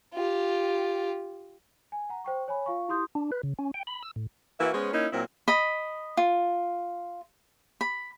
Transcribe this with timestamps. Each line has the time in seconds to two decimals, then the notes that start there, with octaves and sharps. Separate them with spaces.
0.14 F4 G4
1.92 G#5
2.09 F#5 A#5
2.24 C5 G5 C#6
2.48 C#5 G#5 B5
2.66 F4 F5 C#6
2.88 E4 G4 C6 D#6 G6
3.15 D4
3.32 B4
3.43 C#3
3.59 C#4
3.74 G5
3.87 B5
4.03 E6
4.16 A2
4.60 E3 A#3 F#4 E5
4.73 G#3 B3 C#4 C5 C#5
4.93 A#3 C#4 D#4 E4
5.12 A#2 F#3 A#3 C4 E4
5.48 D#5 B5
6.17 F4
7.81 B5